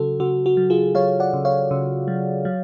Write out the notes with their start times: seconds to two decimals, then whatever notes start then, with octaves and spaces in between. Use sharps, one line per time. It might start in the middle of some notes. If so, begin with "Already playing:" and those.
Already playing: C#3 F#3 F#4 A4
0.20 C#3 F#4
0.46 F#4
0.57 F#3
0.70 F4 G#4
0.95 F#3 C#5 F5
1.20 D5 F#5
1.33 C#3
1.45 C#5 F5
1.71 C#3
2.08 F#3
2.45 F#3